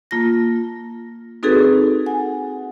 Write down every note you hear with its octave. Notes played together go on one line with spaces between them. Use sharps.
A#3 F4 A5 A#6
C4 D#4 F#4 G#4 A4 B4
F#5 G#5